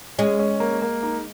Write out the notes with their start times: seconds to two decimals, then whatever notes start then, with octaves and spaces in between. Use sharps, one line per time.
0.18 G#3 C#4
0.39 C#4
0.60 A#3
0.82 A#3
1.03 D#4